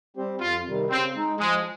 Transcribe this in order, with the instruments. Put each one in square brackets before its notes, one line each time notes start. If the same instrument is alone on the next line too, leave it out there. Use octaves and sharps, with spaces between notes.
[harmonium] G3 C4 G4 C5
[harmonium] F2 [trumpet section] F4
[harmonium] C3 D#3 G3
[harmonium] C#3 [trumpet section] C4
[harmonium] G#3 D#4
[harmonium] F3 [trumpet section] G#3